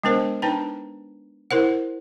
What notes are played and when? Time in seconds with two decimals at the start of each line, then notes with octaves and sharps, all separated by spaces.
0.04 G#3 B3 D4 A#4 C5
0.42 D4 D#4 B4 G5 A#5
1.51 E4 A#4 C5 F#5